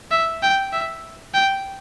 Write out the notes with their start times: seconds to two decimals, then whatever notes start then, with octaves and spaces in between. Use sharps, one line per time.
0.11 E5
0.43 G5
0.73 E5
1.34 G5